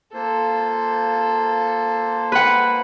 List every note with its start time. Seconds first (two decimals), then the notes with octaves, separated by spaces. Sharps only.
0.14 A#3 F4 A4 C5
2.32 B4 F#5